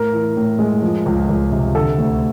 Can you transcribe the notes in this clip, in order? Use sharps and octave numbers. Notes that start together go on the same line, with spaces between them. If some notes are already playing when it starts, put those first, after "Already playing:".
Already playing: A2 A#4
E3
A2
G#3
F3
C#2
C#2
C3
D3 A4
D2